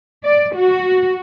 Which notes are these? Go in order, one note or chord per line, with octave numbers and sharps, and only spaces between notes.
D5
F#4